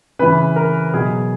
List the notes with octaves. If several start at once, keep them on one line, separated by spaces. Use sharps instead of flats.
C#3 E3 B4
A#4
B2 F#3 G#4